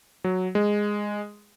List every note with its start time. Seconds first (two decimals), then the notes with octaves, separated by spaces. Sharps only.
0.24 F#3
0.55 G#3